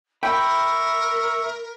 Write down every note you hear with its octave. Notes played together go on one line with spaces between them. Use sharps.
A#4 E5 G5 B5 C#6